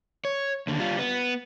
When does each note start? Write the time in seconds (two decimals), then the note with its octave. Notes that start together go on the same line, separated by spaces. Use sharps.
0.25 C#5
0.67 D#2 D3
0.79 G3 F4
0.99 B3